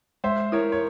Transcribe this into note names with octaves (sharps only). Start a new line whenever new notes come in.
G#3 C5 E5
E4 A#4 C#5
C#5